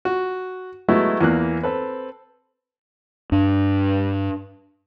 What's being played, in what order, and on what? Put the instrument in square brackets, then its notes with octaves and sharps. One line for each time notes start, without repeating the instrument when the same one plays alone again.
[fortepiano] F#4
F#3 G#3 A3 B3 E4 F#4
E2 E3 A#3 F#6
C4 A4 B4
[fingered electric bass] G2 D4